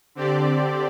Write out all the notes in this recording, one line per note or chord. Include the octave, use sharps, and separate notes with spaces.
D3 C4 G4 D5